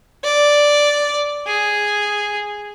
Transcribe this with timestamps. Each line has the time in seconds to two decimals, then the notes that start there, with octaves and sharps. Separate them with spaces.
0.24 D5
1.47 G#4